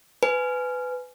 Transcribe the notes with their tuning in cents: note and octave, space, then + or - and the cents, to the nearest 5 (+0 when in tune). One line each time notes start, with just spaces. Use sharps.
B4 +20 G#5 +15